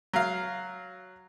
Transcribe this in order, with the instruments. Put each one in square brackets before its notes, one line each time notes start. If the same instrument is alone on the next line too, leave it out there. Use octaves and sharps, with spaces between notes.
[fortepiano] F#3 F5